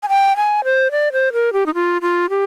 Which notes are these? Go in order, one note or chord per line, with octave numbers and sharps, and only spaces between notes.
G#5
G5
G#5
C5
D5
C5
A#4
G4
D#4
F4
F4
G4